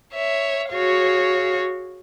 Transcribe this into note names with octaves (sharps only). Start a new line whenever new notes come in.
C#5 E5
F#4 G#4 C#5 F5